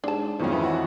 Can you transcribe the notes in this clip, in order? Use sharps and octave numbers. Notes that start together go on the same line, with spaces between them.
G#2 D4 A5
B1 F2 G#2 D#3 F3 C#4
E3
F#4 F#5